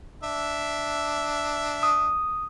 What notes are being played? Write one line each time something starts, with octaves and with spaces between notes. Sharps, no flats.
D4 E5
D#6